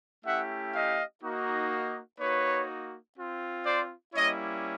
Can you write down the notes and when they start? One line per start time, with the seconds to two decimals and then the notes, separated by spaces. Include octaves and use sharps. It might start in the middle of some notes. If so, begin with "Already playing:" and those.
0.25 A3 C#4 E4 G4 E5 F#5
0.73 D#5 F5
1.22 A#3 D#4 F#4
2.20 A#3 D#4 F#4 B4 C#5
3.17 C4 F4
3.66 C5 D5
4.14 G3 A#3 C#4 E4 C#5 D#5